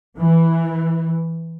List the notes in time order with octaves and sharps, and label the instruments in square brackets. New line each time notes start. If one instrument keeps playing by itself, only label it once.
[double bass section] E3